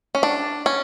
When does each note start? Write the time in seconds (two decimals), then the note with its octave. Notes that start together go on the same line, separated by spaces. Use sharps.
0.15 C#4
0.23 D4
0.66 C#4